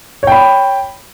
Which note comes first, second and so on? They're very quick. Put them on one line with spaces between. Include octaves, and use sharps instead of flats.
C#5 G5 B5